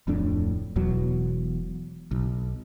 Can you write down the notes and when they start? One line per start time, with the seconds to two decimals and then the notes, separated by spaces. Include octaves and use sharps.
0.07 D1 F2 A2 D4
0.76 E1 E2 B2 F#3
2.11 B1